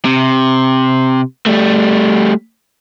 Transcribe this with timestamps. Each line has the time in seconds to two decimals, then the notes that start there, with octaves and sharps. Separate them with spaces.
0.05 C3
1.46 G3 A3